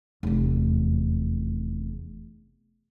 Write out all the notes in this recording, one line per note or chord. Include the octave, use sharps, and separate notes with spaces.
F1 E2